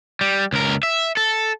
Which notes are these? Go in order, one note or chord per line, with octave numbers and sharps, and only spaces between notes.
G3
C#2 A#4
E5
A4